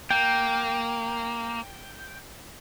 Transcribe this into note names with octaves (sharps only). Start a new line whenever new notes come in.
A#3 G5